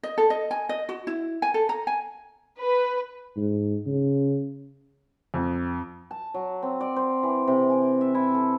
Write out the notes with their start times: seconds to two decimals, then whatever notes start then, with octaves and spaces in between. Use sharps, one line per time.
0.03 D#5
0.18 A4
0.30 D#5
0.51 G#5
0.69 D#5
0.89 F#4
1.07 E4
1.42 G#5
1.54 A4
1.69 A#5
1.87 G#5
2.59 B4
3.36 G#2
3.86 C#3
5.34 F2
6.11 A5
6.34 F#3
6.63 C4
6.81 D5
6.96 C5
7.23 E3
7.48 C3
7.69 G#5
8.01 E5
8.15 E4
8.34 A4